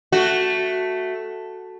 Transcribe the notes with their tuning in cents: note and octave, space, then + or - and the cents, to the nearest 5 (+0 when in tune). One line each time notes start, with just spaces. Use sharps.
A3 +0 F#4 +0